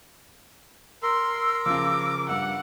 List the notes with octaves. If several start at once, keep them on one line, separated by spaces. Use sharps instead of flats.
A#4 C6 E6
C#3 F3 D6
G2 F#5 E6